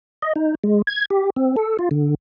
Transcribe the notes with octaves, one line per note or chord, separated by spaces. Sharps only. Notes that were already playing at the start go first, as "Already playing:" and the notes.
D#5
D#4
G#3
G#6
G4
C4
A4
F4
D3